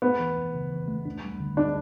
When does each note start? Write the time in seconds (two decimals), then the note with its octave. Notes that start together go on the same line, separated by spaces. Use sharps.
0.02 A3 B3
0.19 E3
0.37 E3
0.54 C#3
0.72 E3
0.88 A3
1.05 D4
1.24 G3
1.40 D3
1.57 D3 D4